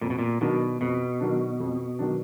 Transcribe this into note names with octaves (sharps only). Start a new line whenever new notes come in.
F2 A#2
B2
A#2
B2 D#3 F#3 D4
F2 B2
D#3 F#3 D4
F2
D#3 F#3 D4